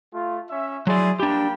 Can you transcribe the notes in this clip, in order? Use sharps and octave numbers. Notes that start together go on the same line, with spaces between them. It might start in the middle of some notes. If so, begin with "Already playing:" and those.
A3 F4
C#4 E5
F#3 E4 G#4 D5 C6
A#3 D4 G4 G5 B5